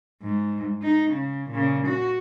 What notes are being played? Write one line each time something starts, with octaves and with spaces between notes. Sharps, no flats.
G#2
D#4
C#3
A#2 C#3
F#4